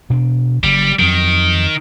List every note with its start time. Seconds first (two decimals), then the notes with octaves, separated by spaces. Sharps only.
0.10 B2 D4
0.64 F#1 G3
0.99 F2 D#3 F#3